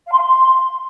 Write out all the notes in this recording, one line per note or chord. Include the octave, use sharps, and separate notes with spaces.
F5
C6
F5
C6